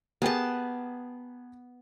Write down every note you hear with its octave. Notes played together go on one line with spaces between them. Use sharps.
B3 G4 G#4 A#4 A5